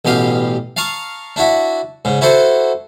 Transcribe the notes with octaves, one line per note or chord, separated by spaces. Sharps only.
A1 B2 G4 F5 D#6
F5 A5 A#5 C#6 D#6
D4 E4 F#4 E5
G#2 C#3
E4 F#4 A4 C5 F#5